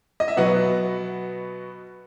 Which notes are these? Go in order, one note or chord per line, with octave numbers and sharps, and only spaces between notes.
D#5
E5
B2 F#3 B3 D#5 F#5